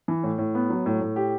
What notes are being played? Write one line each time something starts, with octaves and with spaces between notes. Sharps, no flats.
E3
A2
A2
B3
F#3
A2
A2
G4